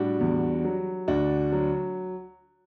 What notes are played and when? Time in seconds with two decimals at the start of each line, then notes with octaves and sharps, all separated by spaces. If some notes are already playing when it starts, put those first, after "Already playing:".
Already playing: A2 G3 D4 F#4
0.21 E2
0.65 F#3
1.08 D2 D4 F#4
1.52 F#3